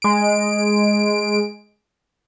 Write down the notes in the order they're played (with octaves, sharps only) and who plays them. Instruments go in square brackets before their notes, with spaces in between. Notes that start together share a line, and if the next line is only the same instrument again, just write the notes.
[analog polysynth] G#3 D7